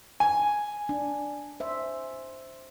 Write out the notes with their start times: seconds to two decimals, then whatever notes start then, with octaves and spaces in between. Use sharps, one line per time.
0.20 G#5
0.89 D4
1.60 C5 E5